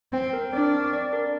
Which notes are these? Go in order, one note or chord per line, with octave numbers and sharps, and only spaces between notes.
C4 G5
A#4
C4 D4
C4
D5
A#4